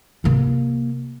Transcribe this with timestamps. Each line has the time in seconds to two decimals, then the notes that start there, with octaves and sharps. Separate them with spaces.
0.24 C3 A#3